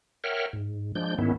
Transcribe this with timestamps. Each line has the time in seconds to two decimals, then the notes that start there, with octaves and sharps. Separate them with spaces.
0.24 A#4 C#5 E5 F#5 G5 F6
0.53 G#2
0.95 F3 G#3 D4 G6
1.19 G#2 D#3 B3 C#4 E4